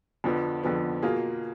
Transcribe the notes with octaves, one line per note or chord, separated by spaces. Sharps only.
F2 D3 F3 B3
F2 D3 F3 B3
B2 A#3 F4 G#4